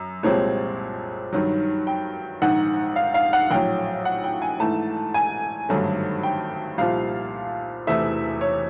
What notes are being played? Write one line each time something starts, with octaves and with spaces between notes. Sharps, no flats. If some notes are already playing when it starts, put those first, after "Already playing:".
Already playing: F#2
C2 A#2 F3 G#3 C4 C#5
G2 D#3 F#3
G5
A#1 G#2 D#3 F#5
F5
F5
F#5
A#1 A2 F#3 G5
F#5
G5
G#5
G#2 E3 A3 A5
G#5
G#1 G2 D3 F#3 A3
G5
C2 A#2 F3 F5
E1 E2 C3 E3 A3 E5
C#5